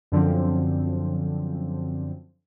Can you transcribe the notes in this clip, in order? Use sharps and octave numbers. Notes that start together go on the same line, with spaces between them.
F#2 D3 F3 C4